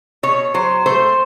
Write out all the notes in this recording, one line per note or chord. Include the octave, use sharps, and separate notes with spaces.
B2 C#5
F#3 C5
A3 C5